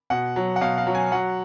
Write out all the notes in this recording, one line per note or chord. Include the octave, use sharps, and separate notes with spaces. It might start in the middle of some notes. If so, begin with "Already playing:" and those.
B2 F#5
F#3
F#5
B2 F5
F5
F#3
G#5
F#3 F#5